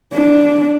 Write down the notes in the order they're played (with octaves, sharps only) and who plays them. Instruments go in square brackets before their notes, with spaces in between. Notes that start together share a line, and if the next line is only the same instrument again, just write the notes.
[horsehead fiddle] D4